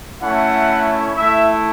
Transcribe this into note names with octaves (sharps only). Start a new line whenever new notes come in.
A3 C#4 E4 F#5
A3 E4 E5